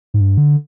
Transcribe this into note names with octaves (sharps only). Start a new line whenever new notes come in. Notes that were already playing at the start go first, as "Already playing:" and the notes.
G#2
G2
D3